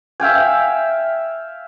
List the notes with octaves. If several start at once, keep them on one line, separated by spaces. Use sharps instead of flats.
E5 F5 G5 G#5